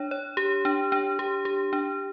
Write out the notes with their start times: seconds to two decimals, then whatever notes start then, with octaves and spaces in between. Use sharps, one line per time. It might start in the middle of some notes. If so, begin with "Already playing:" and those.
Already playing: D4 C#5
0.11 C#5
0.37 G4
0.65 D4
0.92 D4
1.19 G4
1.45 G4
1.73 D4